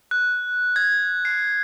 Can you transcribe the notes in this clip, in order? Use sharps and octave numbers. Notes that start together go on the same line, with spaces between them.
F#6
G#6
C7